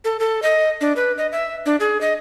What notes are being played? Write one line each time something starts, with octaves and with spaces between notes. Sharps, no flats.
A4
A4
D#5
D4
B4
D#5
E5
D4
G#4
D#5